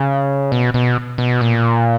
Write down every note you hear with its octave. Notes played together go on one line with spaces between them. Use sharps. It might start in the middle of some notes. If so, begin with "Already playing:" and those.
Already playing: C#3
B2
B2
B2
A#2